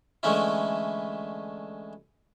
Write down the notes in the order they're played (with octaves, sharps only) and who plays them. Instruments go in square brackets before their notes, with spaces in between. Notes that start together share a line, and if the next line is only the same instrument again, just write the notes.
[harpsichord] D3 E3 G#3 A3 C#4 E4